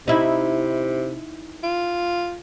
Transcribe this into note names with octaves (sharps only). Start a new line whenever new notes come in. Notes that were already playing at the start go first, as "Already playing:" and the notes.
C3 D#4 E4
F4